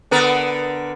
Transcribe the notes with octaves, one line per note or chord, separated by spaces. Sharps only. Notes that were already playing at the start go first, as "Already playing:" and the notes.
D3 B3 A#4